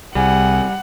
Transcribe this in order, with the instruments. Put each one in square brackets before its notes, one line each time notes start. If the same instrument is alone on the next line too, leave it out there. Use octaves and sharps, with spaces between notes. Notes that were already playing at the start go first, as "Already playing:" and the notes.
[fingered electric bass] C2 [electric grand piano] G3 [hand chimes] G#4 G#5 [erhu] F#5